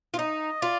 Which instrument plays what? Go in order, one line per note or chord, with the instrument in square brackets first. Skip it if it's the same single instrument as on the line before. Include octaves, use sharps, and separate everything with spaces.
[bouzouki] F4
[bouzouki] D#4 [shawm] D#5
[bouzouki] F4 [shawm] D5